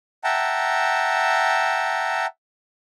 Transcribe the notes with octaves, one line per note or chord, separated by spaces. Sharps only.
E5 F#5 G5 A5 A#5